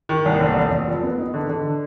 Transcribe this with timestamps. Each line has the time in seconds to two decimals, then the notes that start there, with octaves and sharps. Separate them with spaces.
0.09 D#3
0.26 C2
0.41 F1
0.57 F1
0.71 F1
0.87 F3
1.03 B3
1.18 D#4
1.34 D3
1.49 D3